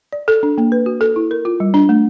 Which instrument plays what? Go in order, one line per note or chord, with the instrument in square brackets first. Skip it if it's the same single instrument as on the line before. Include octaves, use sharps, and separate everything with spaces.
[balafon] D5
A4
D4
A#3
B4
F#4
A4
E4
A#4
F4
G3
D4
A3